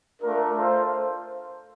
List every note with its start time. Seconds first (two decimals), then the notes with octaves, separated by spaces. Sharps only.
0.22 A3 D4 F4 A#4
0.56 F4 A4 C5 F5